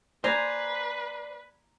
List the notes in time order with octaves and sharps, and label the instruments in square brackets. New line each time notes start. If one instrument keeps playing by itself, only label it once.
[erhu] B4 [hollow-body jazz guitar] C5 [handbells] D5 C7 [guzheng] G#5 A#5